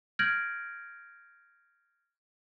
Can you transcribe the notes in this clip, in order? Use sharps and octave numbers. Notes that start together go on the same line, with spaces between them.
F6 G6 G#6 A#6 D7 F#7